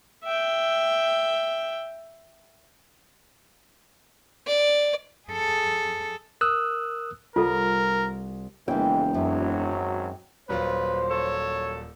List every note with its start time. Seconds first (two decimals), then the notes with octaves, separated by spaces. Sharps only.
0.24 E5 G5
4.47 D5
5.28 G#4 A4
6.41 A#4 D#6 E6 F#6
7.36 C2 F4 A4 A#4
8.68 E1 F2 C#3 E3 G#3 A#3 G5
9.14 G#1 F#2 F#3
10.49 D#1 F#3 F4 B4 C5
11.10 A4 C#5